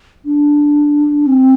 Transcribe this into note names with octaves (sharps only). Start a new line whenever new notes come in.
D4
C4